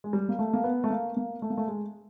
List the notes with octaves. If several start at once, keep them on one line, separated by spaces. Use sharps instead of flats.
G#3
G3
A#3
A3
A#3
B3
A3
A#3
A#3
A3
A#3
A3
G#3